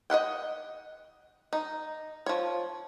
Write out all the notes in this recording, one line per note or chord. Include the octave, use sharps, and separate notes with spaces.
D#5 E5 F#5 G5
D#4
F3 C#5